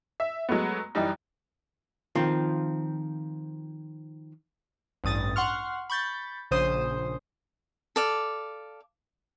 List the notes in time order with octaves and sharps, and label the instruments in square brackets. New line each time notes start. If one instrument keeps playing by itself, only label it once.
[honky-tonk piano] E5
F#3 G#3 A3 B3
F#2 E3 G3 D#4
[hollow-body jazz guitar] D#3 F3 C4 F4
[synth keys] A1 G2 D#6 A6
F#5 C6 C#6 F6
B5 C#6 G6 A6
A#1 C#3 C5 D#6
[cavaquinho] A4 D5 F5